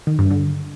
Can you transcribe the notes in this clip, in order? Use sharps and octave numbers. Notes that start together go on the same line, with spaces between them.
D#3
G2
D3